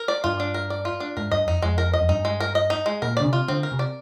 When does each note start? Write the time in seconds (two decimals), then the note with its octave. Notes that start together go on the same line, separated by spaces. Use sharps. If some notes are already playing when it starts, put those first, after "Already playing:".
Already playing: A#4
0.08 D5
0.24 G2 F4
0.40 D4
0.54 A#4
0.70 D5
0.85 F4
1.00 D4
1.17 G#2 A#4
1.31 G2 D#5
1.47 F2 D#4
1.62 F2 G#3
1.78 A#4
1.93 D#5
2.01 F2
2.09 G2 D#4
2.25 G#3
2.40 A#4
2.55 D#5
2.70 D#4
2.86 G#3
3.02 A#2 A#4
3.17 D3 D5
3.24 C3
3.33 F4
3.48 D3 C4
3.63 A#4
3.72 C3
3.79 D5